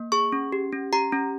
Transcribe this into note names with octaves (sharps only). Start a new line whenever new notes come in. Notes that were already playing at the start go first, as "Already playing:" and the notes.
Already playing: A#3
G#4 C#6
C#4
G4
C#4
G4 A#5
C#4